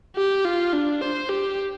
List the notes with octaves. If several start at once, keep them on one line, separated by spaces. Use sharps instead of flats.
G4
F4
D4
C5
G4